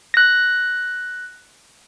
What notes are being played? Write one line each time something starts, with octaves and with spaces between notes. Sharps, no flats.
F#6 A#6